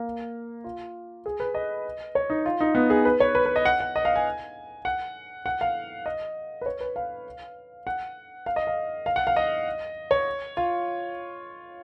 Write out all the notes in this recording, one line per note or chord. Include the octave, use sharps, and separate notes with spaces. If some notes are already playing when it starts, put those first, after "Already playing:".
Already playing: A#3
F4
G#4
B4
D#5
C#5
D#4
F4
D#4
B3
G#4
B4
C#5
B4
B4
D#5
F#5
F#5
D#5
F5
G#5
F#5
F#5
F5
D#5
B4
C#5
B4
F5
F#5
F5
D#5
F5
F5
F#5
F5
D#5
C#5
F4